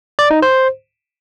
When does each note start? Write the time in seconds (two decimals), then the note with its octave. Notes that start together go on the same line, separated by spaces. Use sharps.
0.19 D5
0.31 D#4
0.42 C5